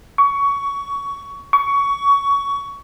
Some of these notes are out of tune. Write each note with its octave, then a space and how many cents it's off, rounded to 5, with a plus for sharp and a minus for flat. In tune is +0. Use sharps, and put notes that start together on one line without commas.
C#6 +20
C#6 +20